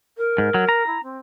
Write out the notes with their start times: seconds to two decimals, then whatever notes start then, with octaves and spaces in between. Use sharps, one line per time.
0.17 A#4
0.38 G#2
0.54 F#3
0.69 A#5
0.86 E4
1.02 C4